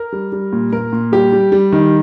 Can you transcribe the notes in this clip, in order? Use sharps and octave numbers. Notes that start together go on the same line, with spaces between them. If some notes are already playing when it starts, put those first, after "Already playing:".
Already playing: A#4
G3
G3
A#2
A#2 A#4
A#2
G3 G4
G3
G3
D#3